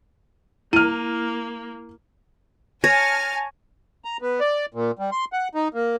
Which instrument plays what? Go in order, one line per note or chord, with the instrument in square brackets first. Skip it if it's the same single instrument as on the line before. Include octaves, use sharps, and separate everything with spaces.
[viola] A#3 [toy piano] E4 [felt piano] F6 D#7
[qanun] C#5 [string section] G#5 A5 F6 [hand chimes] A#6
[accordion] A#5
B3
D5
A#2
G3
C6
F#5
D#4
A#3